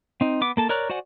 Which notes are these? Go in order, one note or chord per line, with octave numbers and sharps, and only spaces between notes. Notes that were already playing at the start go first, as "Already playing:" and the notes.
C4 D#4
B3 D6
A#3 A4 A5
A#4 C#5 D5 A#5 F#6
F#4 C5 D5 F#5 G#5